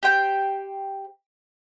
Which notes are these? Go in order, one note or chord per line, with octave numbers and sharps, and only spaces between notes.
G4 C5 G5